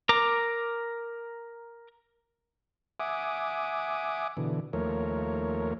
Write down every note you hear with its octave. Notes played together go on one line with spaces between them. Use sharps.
A#4 A#5 D6
E5 F#5 G#5 D6 D#6
B2 D3 E3
D#2 F3 A3 A#4 C#5